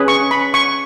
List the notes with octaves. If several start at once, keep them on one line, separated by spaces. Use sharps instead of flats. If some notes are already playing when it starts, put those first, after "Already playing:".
Already playing: C#4 G#4 B4
C#6
B5
C#6